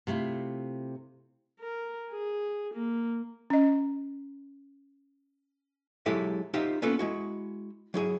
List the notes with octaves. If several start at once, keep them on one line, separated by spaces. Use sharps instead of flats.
C3 A3 E4 F4
A#4
G#4
A#3
C#4 D#5
F#3 G#3 E4 G4 A4 E5
D#4 F4 G4 C5 E5
A#3 B3 C#4 F4 A4 B4
G#3 E4 F#4
F#3 E4 G#4